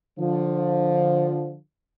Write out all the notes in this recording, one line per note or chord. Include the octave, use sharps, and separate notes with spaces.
D3 F3